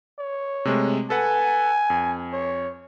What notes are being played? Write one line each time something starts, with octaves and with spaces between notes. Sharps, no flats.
C#5
C3 G#3 A3
A4 B4 F#5 G#5
F2
C#5